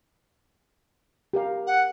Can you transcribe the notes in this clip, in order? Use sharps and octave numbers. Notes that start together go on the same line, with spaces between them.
G4 A#4 F5
F#5